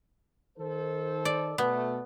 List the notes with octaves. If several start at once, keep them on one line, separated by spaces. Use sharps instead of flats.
D#3 A4 C5
D5
B2 A3 B3